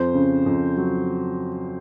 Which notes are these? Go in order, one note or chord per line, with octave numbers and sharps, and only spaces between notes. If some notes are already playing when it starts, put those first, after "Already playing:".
Already playing: F2 C5
C#3
F2
F#3